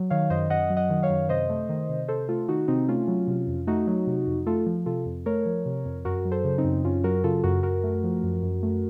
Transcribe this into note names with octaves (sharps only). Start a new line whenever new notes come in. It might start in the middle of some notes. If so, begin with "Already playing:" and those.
Already playing: F#3
D#3 C#5 F5
F#2 C5 D#5
F#2 D#5 F#5
F#3
D#5 F#5
D#3
C#5 F5
F#2
C3 C5 D#5
A3
D#3
C3
C3 A4 C5
A3 F4 A4
D#3 D#4 F#4
C3 C4 D#4
A3 C#4 F4
F#3
C3
F2
A3 D#4 F#4
F#3
C3
F2
A3 F4 A4
F3
C3 F4 A4
F2
A3 A#4 C#5
F3
C3
F2
F#2 F#4 A#4
F#3
A4 C5
C#3
C4 D#4
F#2
F#2 C#4 F4
F#3 F#4 A#4
C#3 F4 A4
F#2 F#4 A#4
F#2 F#4 A#4
A3
F3
F#2
F#2
A3